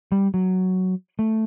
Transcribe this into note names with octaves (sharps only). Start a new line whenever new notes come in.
G3
F#3
A3